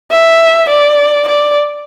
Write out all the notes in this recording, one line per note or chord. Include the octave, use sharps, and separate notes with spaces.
E5
D5
D5